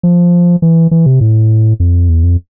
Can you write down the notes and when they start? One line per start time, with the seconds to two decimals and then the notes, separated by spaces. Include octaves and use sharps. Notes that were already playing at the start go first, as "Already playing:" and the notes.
0.03 F3
0.62 E3
0.91 E3
1.06 C3
1.21 A2
1.80 F2
2.09 E2
2.23 F2